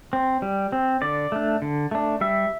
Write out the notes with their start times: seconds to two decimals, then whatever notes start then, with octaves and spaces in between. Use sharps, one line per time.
0.13 C4
0.42 G3
0.72 C4
1.02 D3 D5
1.32 A3 D4
1.62 D3
1.91 A3 D4
2.21 G3 E5